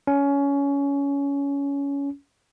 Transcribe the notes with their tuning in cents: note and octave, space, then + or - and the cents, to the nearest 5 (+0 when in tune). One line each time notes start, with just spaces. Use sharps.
C#4 +20